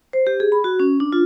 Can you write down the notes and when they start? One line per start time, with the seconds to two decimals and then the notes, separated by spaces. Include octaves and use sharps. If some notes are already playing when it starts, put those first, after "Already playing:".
0.13 C5
0.27 G4
0.40 G#4
0.52 B5
0.64 F#4
0.80 C#4
1.00 D4
1.13 F4